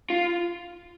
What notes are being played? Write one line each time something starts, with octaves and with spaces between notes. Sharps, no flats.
F4